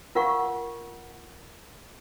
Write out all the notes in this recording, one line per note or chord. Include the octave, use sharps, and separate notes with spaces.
F4 A#4 F5 F#5 C#6